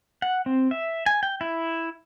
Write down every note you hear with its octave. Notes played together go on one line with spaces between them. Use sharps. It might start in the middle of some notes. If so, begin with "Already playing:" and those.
F#5
C4
E5
G#5
G5
E4